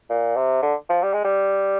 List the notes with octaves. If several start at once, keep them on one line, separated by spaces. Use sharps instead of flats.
A#2
C3
D3
F3
G3
G#3
G3